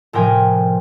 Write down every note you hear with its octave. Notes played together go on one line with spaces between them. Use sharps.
F1 A2 F3 A#4 G5 G#5